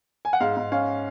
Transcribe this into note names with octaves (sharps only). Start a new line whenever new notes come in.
G#5
F#5
G#2 F5
G#2
C#4 F5